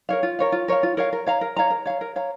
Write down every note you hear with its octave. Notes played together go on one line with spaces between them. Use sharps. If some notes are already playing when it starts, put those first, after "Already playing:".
A#4 C#5 F5
F4
A#4 C#5 F5
F4
A#4 C#5 F5
F4
A#4 C#5 F5
A#4
C#5 F5 A#5
A#4
C#5 F5 A#5
A#4
C#5 F5 A#5
A#4
C#5 F5 A#5